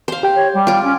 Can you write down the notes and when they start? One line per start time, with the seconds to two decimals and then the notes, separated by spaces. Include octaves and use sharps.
0.08 C5 F5
0.23 G4 G5
0.35 C#5
0.54 G3
0.67 F4 D6
0.83 C#4